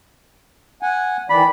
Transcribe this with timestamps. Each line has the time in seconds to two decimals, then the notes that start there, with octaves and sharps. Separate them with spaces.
0.83 F#5 G#5
1.30 D#3 E3 D5 B5